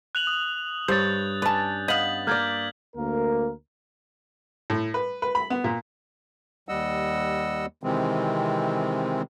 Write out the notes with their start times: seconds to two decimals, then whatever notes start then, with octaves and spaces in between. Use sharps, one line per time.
0.15 F#6 F7 F#7
0.27 D#6
0.88 G2 C5 C#5 G6 A6
1.42 C#4 B4 D5 A5
1.88 B3 D#5 F5 G6 B6 F#7
2.27 A#3 A#4 D5 F6 G6 G#6
2.97 D2 A#3 A#4
4.70 A2
4.94 B4
5.22 B4
5.35 B5
5.50 B3
5.64 A#2
6.69 D#2 G3 D#5 F#5 E6
7.83 C3 D#3 E3 G#3 C4